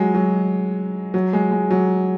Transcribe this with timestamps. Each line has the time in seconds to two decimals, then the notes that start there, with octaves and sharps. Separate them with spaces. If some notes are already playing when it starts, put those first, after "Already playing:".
Already playing: F#3 G#3
0.14 F#3
1.14 F#3
1.33 G#3
1.51 G#3
1.71 F#3